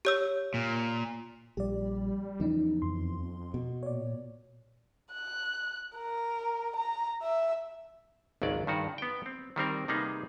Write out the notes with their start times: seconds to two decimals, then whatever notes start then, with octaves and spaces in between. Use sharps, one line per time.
0.05 G4 C#5 E6
0.54 A#2
1.57 A#1 G3 G4 D5
2.40 E2 C#3 F3 D#4
2.82 F2 C6
3.54 B2
3.83 A#2 C#5 D5
5.12 F#6
5.96 A#4
6.76 A#5
7.23 E5
8.42 G#1 C#2 F#3 D5
8.67 G2 D#3 F#4
8.98 B3 G5
9.26 C4
9.56 D#3 G3 C4 A#4
9.88 C3 G3 A#3 B3 D#4 G#4